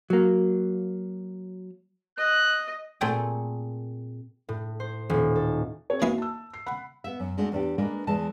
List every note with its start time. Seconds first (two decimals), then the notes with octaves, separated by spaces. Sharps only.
0.10 F#3 A#3
2.18 D#5 F#6
3.01 A#2 A3 C4 G#4 A4 G5
4.49 A2
4.80 C5
5.10 D#1
5.35 A4
5.90 C4 G#4 C#5
6.02 E3 A#3 D#4 F#4
6.18 A5 E6
6.54 C7
6.67 F#5 B5
7.04 B3 E5
7.20 F#2
7.37 G#3 A3 D4 F#4
7.52 E2 D4 G4
7.78 G#3 A#3 D4 A#4 B4
8.07 E2 E3 G#3 A5